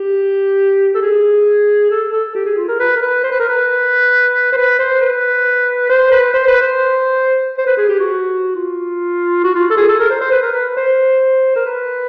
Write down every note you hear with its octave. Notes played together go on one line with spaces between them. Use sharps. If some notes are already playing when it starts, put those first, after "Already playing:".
Already playing: G4
A4
G#4
A4
A4
G4
G#4
F4
A#4
B4
A#4
B4
C5
B4
A#4
B4
C5
B4
C5
B4
C5
B4
C5
B4
C5
C5
B4
G#4
G4
F#4
F4
F#4
F4
A4
G#4
A4
A#4
C5
C5
B4
A#4
B4
C5
A#4
B4